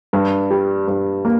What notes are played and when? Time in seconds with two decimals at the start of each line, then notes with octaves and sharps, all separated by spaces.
0.13 G2
0.50 G3
0.88 G2
1.25 A#3